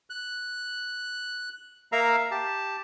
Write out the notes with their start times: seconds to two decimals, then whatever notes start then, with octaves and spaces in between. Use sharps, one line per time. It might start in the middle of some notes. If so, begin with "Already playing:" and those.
0.10 F#6
1.92 A#3 A#4 E5 F5 A#5
2.31 G4 A5